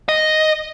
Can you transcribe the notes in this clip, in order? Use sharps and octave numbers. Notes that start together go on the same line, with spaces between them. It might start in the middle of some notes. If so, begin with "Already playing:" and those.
D#5